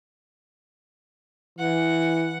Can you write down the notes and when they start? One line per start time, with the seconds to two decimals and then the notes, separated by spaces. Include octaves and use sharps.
1.59 E3 F#5